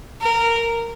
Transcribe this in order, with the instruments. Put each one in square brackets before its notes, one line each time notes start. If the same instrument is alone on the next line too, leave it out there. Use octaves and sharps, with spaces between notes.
[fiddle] A#4